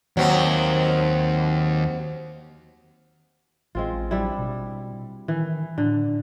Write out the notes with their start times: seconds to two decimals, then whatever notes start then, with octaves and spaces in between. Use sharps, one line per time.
0.17 D#2 F#3 C4
3.75 A1 G#3 C4 F4
4.11 G3 D4 E4
4.38 B2
5.28 D#3 E3
5.78 A2 D3